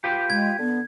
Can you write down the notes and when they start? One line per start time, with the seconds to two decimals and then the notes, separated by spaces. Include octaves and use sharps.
0.04 F4 G4 B4 G5
0.30 G#3 G#6
0.59 D3 B3